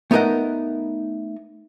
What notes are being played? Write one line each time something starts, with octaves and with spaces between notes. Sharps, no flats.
A3 B3 D#4 A#4 D#5 F#5